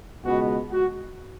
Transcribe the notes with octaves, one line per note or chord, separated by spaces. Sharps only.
C#2 B2 G#3 B3 F#4
F#4